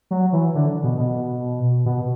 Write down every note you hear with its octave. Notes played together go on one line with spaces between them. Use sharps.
F#3
E3
D3
B2
B2
B2